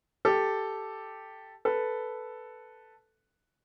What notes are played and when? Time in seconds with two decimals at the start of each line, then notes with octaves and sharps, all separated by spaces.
0.25 G4 A4
1.65 A4 B4